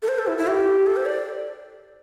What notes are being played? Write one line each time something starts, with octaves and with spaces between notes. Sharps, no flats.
A4
C5
A4
E4
E4
G4
A4
C5
D5